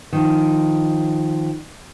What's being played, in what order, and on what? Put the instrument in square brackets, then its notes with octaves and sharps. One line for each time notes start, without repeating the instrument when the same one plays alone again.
[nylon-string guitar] D#3 F3